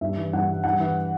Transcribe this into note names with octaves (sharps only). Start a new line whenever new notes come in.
G2 E5
E3
G2 F#5
E3
G2 F#5
E3